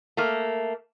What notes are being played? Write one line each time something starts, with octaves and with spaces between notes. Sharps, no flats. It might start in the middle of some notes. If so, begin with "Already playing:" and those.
A3 A#3